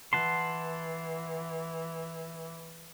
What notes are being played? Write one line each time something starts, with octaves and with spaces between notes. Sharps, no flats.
E3 F#5 A5 C6